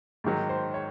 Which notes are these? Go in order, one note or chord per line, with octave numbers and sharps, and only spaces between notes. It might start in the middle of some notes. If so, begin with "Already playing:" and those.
G#2 D#3 F#3
C5
C#5